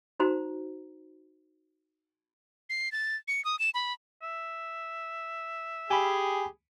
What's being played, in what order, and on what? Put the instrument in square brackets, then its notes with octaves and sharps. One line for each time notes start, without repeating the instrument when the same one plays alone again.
[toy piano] D#4 F#4 C5 A#5
[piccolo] C7
A6
C#7
D#6
E7
B5
[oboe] E5
[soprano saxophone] G4 [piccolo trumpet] G#4 [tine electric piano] G#5 B5